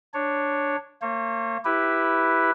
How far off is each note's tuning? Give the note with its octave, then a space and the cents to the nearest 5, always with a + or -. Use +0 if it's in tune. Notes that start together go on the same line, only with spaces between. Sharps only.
D4 +0 C#5 +0
A#3 -35 C#5 -40
E4 +0 G4 +0 B4 +0